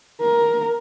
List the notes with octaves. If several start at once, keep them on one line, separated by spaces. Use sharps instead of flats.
A#4